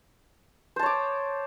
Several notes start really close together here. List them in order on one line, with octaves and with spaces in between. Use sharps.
C5 A5 C#5 D6